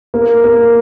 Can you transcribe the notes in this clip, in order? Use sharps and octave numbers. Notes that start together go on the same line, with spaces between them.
A#3
A#3